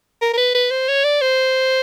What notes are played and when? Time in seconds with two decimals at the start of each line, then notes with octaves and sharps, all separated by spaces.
0.22 A#4
0.34 A#4
0.37 B4
0.55 B4
0.71 C5
0.88 C#5
1.05 D5
1.21 C5